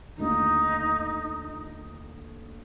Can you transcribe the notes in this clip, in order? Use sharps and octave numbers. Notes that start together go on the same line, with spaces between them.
D#2 D3 A3 D4 D#4 F4